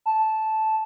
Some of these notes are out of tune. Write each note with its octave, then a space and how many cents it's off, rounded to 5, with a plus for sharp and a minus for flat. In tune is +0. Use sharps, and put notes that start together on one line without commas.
A5 -10